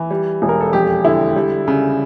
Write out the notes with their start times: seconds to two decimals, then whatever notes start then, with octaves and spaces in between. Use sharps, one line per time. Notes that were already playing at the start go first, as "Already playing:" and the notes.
Already playing: E3
0.11 G3
0.42 E1
0.49 A#4
0.61 A4
0.73 F2 G4
1.05 D3 E4
1.36 G3
1.68 C#3